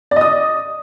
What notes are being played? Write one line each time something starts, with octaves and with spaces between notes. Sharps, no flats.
D5 D#5 D#6